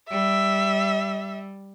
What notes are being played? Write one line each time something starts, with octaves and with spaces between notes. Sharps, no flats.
G3 E5